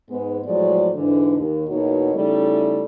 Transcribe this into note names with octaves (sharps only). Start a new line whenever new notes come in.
G#2 G#3 B3
A2 F3 F#3 G#3 D5
G#2 D3 E3
D#2
E2 B2 A#3 D#4 F#4 C#5
C#3 G3 A3 D#4 E4 A4